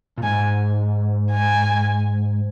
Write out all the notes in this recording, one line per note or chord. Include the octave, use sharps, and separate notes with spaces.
A#2
G#2 G#5
G#5